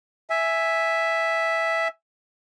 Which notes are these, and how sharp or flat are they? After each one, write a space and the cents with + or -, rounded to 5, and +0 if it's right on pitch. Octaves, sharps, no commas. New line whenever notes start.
E5 +0 G#5 +0